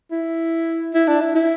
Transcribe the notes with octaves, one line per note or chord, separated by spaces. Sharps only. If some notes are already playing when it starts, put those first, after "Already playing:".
E4
E4
D4
E4
E4